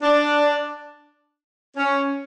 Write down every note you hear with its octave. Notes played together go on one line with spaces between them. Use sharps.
D4
C#4